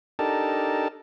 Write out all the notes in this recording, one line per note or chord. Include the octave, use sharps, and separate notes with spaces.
D4 D#4 G4 A4 A#4 A5